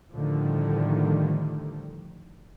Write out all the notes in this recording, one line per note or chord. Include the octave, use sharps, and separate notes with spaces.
A2 D3 D#3 F3 G3